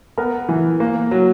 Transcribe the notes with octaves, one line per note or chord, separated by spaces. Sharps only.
B3 A#4
E3
A#3
F#3